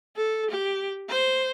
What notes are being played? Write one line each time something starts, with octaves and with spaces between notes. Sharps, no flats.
A4
G4
C5